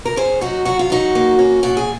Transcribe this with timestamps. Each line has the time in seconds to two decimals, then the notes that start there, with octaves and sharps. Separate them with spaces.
0.05 A#4
0.16 C#4 G#4 C5
0.41 F#3 D#4 F#4
0.65 F#3 F#4
0.79 F4
0.90 F#3 D#4 F#4
1.15 A#3
1.39 C#4
1.63 A#2 F#4
1.77 G#4